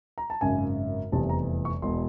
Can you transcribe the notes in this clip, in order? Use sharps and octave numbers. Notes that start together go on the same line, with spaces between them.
A#5
A5
G#1 F#2 C#3 G#5
F1 E2 C3 E3 G3 A5
A#5
C#6
E1 E2 B2 C6